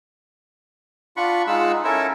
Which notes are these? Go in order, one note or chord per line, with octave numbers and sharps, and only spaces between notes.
D4 F4 F#5 B5 C#6
G#3 D#4 F4 F#5 E6
C#4 E4 A4 A#4 E5